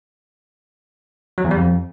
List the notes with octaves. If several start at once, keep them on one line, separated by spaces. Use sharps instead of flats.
F#3
E2
G3
F2